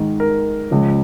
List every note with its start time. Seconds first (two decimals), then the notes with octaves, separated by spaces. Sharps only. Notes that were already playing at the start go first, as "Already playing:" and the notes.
Already playing: G#2 D#3
0.20 A#4
0.71 C#2 C#3 F3